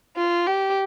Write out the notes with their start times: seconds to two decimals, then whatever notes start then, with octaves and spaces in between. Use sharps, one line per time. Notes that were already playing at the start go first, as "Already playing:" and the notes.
0.16 F4
0.47 G4